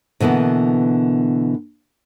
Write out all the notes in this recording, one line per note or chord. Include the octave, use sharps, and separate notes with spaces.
B2 D3 E3 A#3 B3